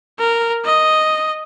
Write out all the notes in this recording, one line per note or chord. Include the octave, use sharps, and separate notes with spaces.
A#4
D#5